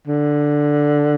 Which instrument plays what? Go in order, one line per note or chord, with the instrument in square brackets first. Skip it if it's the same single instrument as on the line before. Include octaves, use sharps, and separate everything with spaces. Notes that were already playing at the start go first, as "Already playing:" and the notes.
[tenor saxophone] D3